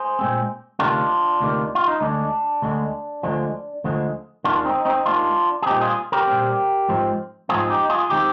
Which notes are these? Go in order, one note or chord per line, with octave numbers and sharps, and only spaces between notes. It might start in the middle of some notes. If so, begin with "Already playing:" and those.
Already playing: G#4 C5
A#2 G#3 C4
D2 C3 D#3 A#3 D4 F4
D2 C3 D#3 A#3
F4
D#4
D2 D3 G#3 D4
D2 D3 G#3
D2 D3 F3 G#3
D2 D3 F3 G#3
D#2 D#3 G#3 D4 F4
C4 D#4
C4 D#4
D#2 D#3 G#3 D4 F4
G#4
A#2 G3 C4 D#4 G4
F4 G#4
G4 A#4
A#2 G3 C4
G#2 F3 G#3 C4
G#2 F3 G#3 C4 F4 G#4
G#4
D#4 G4
F4 G#4
D#3 G#3 C4 D#4 G4